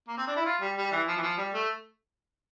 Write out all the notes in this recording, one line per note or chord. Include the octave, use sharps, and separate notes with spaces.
A#3
C4
D4
E4
F4
G3
G3
E3
F3
E3
F3
G3
A3